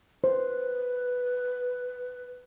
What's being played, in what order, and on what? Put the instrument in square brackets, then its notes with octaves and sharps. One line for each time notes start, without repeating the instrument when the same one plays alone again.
[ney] B4 [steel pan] C5